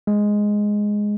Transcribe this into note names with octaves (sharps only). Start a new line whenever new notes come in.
G#3